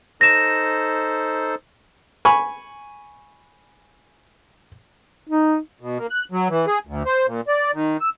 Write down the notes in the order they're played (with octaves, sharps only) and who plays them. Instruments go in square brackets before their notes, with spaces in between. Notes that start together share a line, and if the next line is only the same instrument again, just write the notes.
[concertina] D#4 A4 C5 [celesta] A#6 E7
[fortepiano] G#5 B5 C#6
[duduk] D#4
[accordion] B2
A#3
F#6
F#3
E3
G#4
D2
C5
A#2
D5
D#3
E6